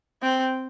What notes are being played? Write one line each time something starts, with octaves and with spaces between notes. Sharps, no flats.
C4